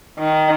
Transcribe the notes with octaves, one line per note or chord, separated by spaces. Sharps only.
D#3